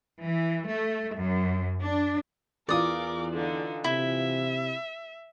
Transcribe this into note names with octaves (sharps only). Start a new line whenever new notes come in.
E3
A3
F#2
D4
E2 E3 F4 A#4 D5 D6 D#6
D3 D#4
C3 E4 E5